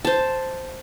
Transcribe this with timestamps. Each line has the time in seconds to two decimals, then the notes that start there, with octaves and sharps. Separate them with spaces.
0.05 C5 A5